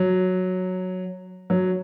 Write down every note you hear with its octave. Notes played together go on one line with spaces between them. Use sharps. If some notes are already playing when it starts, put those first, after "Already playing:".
Already playing: F#3
F#3